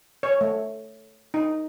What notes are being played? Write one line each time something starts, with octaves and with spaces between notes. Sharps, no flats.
C#5
A3
D#4